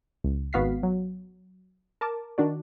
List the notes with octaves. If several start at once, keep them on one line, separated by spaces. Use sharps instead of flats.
C#2
G#1 B3 F#4 F5 B6 C7
F#3
A#4 A5 D6
D#3 D4 F#4 D5